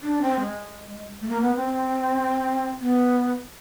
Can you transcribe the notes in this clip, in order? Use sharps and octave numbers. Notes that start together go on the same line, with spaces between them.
D4
C4
G#3
A3
A#3
B3
C4
B3